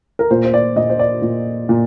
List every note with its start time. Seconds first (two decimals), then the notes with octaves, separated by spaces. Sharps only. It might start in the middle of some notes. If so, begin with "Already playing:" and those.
0.19 A#4
0.31 A#2 C5
0.45 C5
0.54 D5
0.76 A#2 D#5
0.89 C5
0.99 D5
1.22 A#2
1.69 A#2